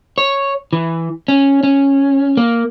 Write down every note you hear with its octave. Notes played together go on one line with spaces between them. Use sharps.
C#5
E3
C#4
C#4
A#3